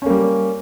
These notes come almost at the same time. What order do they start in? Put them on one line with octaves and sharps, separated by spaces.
C#4 A#3 G3